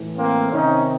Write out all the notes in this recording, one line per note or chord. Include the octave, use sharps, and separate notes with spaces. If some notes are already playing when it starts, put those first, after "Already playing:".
Already playing: A2 E3
A#3 C4
C3 D#3 C#4 D#4